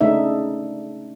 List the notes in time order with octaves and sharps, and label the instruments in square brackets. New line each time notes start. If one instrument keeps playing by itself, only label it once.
[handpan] C#3 A3 D4 D#4 E5